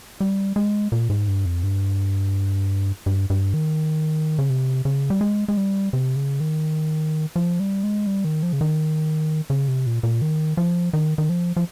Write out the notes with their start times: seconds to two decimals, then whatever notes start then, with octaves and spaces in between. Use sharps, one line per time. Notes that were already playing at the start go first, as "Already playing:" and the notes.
0.21 G3
0.56 G#3
0.92 A#2
1.10 G#2
1.28 G2
1.46 F2
1.63 G2
3.06 G2
3.30 G2
3.54 D#3
4.39 C#3
4.50 C3
4.85 C#3
5.10 G3
5.21 G#3
5.48 G#3
5.57 G3
5.93 C3
6.16 C#3
6.40 D#3
7.36 F3
7.60 G3
7.83 G#3
8.07 G3
8.25 D#3
8.43 F3
8.53 C#3
8.61 D#3
9.50 C#3
9.68 C3
9.86 A#2
10.03 A#2
10.22 D#3
10.57 F3
10.93 D#3
11.18 D#3
11.29 F3
11.56 F3